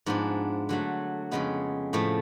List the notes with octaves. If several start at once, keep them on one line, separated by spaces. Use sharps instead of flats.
G#2 F3 B3 D4
D3 F#3 A3
F2 C#3 G#3 B3
A2 F3 A3